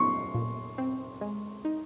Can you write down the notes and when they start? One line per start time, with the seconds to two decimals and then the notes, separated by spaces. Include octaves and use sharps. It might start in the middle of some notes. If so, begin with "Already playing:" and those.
Already playing: G#3 D#4 C6 C#6
0.35 A#2
0.78 C4
1.21 G#3
1.65 D#4